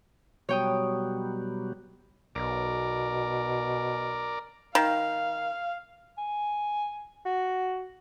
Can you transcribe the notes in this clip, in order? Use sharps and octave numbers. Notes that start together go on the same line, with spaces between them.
B2 F#3 G3 C#5 G5 D#6
B1 B2 A#4 D5
D#3 F5
G#5
F#4